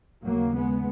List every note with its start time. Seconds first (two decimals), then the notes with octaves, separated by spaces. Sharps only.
0.23 D#2 C#3 F#3 A#3
0.54 G#3 B3